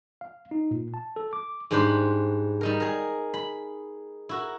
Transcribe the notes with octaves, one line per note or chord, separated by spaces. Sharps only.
F5
D#4
A#2
A5
A4
D6
G#2 G3 D4 B4 C5 B5
G3 D#4 A#4
G#4 A#4
B5
E4 F#4 A#4